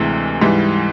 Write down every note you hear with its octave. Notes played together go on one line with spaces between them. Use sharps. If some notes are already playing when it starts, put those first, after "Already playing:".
Already playing: D2 C3 E3 G#3
G#2 E3 G3